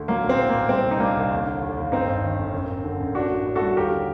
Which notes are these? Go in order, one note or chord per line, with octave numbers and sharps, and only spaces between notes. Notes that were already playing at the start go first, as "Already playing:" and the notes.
Already playing: D2
F#3 A#3
A#1
C4
A2
A#3
A#1
G3 C4
C2
D#4
G3 A#3 D4
C2
D#2
D3
D#2
D#2
G1 C4 D#4
G2
D#3
G1
F#2
F#2
D3
F#2
A1 D4 F#4
A1
A2
F#4 A4
G3
D#2 G4 A#4
D3